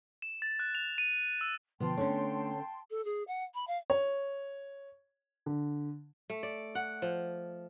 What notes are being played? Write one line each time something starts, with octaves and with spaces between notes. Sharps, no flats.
E7
A6
F#6
F7
D#7
E6
B2 D3 F3 B3 F4 G5 A5 C6
D3 A3 C#4 D4 C#5
A4
G#4
F#5
B5
F5
C#5
D3
A3
D5
F#5
F3